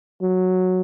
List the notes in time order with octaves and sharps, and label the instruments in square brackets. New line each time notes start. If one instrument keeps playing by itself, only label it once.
[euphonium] F#3